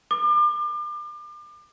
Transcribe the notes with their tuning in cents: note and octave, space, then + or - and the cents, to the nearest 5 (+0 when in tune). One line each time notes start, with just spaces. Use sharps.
D6 +35